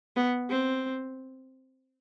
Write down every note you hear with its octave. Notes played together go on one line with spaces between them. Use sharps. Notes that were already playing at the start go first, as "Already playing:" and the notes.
B3
C4